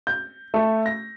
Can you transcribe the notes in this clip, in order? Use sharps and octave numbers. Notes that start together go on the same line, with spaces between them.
G6
A3
A#6